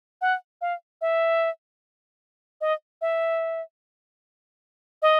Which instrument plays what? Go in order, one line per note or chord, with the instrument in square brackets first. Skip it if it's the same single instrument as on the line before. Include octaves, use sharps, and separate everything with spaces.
[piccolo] F#5
F5
E5
D#5
E5
D#5